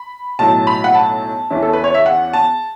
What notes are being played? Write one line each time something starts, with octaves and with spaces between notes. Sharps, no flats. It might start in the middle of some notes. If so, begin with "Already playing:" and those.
Already playing: B5
B1 A2 F#3 A5
B5
F#5
A5
E2 E3 C#4 E4
A4
B4
C#5
E5
F#5
A5